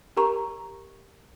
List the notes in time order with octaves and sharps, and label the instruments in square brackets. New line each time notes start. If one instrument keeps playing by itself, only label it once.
[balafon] G4 A#4 A#5 C#6